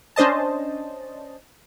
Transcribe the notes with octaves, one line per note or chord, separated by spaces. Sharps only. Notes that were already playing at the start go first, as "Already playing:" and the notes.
C#4 D4 C5 D#5 A5